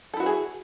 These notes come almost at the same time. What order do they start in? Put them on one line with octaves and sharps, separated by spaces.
A4 E4 F#4 B4 G#4